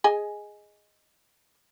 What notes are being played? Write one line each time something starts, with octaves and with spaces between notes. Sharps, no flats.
G#4 D#5 G#5